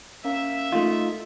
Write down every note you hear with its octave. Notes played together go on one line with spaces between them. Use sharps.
A#3 C#4 E5
A3 D#4 F4